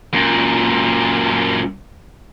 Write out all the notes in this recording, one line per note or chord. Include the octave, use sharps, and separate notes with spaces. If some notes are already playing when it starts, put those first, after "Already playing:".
F#2 A#2